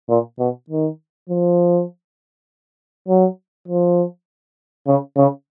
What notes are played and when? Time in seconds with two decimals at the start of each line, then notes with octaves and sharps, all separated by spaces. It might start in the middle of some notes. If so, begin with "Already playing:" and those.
0.09 A#2
0.39 B2
0.70 D#3
1.29 F3
3.08 F#3
3.68 F3
4.87 C#3
5.17 C#3